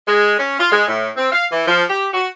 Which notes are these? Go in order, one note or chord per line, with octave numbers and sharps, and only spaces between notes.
G#3
C#4
F4
G#3
A2
C4
F5
E3
F3
G4
F#4